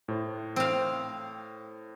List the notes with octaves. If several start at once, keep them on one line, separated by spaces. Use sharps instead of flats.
A2 C5
C4 F5